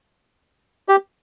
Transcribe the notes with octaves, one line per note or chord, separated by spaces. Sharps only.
G4